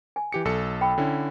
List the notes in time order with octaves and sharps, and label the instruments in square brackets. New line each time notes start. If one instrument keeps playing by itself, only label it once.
[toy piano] G#5
[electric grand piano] E3 G4 C#7
B1 A4 C#7
[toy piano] G5 B5
[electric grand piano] D3 C#4 E4